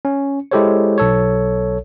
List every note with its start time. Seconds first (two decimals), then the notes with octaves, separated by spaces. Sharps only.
0.05 C#4
0.51 G#3 E4 G4 A4 C5 C#5
0.98 B1 A4 C#5